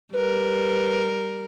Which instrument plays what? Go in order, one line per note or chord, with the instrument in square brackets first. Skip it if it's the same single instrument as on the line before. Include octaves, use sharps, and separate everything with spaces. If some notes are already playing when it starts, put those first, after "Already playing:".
[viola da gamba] G3 A#4 [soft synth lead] B4